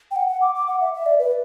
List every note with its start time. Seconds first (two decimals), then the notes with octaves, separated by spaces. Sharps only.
0.11 G5
0.16 F#5
0.28 F#5
0.41 D6
0.55 D6
0.68 F#5
0.81 E5
0.93 E5
1.06 D5
1.19 B4